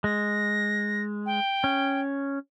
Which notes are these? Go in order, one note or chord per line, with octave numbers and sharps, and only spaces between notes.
G#3 A#6
G5
C#4